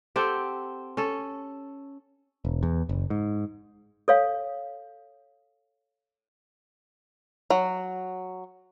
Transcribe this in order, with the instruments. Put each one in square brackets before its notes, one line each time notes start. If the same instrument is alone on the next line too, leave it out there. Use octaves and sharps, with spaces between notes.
[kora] C4 G4 A4 F#5
C#4 A4
[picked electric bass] E1
E2
F#1
G#2
[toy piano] A4 C#5 F5
[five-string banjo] F#3